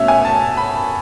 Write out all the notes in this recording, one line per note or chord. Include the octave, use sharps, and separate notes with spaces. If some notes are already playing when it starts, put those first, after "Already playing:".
Already playing: B2 A3 C#4 E5
G#5
A5
B5